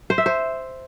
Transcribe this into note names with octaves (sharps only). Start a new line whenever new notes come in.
C5
E5
C5